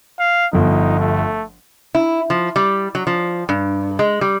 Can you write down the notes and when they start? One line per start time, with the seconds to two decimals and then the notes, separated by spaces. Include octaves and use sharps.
0.19 F5
0.53 G1 F3 D#4
0.99 A3
1.95 E4
2.30 F3
2.56 G3
2.95 F#3
3.07 F3
3.49 G2
3.99 G#3
4.21 G3